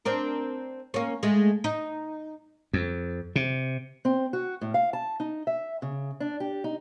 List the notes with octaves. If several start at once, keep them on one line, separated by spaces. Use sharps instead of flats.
C4 D4 A#4
A#3 C#4
G#3 A3
D#4
F2
C3
C4
F#4
A2
F5
A5
D#4
E5
C#3
D4
G4
D#4